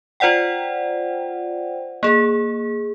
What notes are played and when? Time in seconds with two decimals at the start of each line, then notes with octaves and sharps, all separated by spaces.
0.20 F4 C5 D5 F#5 G5
2.03 A#3 G#4